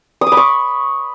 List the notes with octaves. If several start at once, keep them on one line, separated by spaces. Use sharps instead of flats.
D#6
D6
B5
C#6